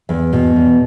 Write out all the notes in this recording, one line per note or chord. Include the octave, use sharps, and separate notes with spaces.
E2
B2
E2